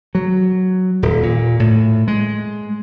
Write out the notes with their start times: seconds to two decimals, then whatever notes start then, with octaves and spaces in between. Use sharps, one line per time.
0.15 F#3
1.02 D#1
1.23 A#2
1.60 A2
2.08 G#3